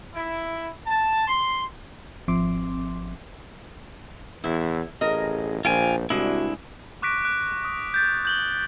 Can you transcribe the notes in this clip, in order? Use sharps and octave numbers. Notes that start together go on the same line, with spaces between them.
E4
A5
C6
G#1 F3 C4 E5 C6 D6
E2 E4
A1 G#4 A#4 D#5
A#1 F4 C5 G5 G#5
C2 G#3 D4 E4 F#4
C#6 D6 F#6 A#6 B6 D7
F#6 D7
D#6
G6 A6 B6
G6 F#7 G7